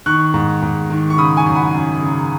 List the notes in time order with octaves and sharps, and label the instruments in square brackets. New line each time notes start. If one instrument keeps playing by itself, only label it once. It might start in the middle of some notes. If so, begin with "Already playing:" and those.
[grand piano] D#3 C#6 F#6
G#2
G#2
D#3
C#6
C#3 B5 D#6
G#5 C#6
F#2
F#5 B5
F#2
C#3